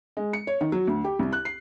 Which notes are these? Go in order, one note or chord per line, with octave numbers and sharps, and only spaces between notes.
G#3
C#7
C#5
D#3
F#3
D2
G4
C2
F#6
C7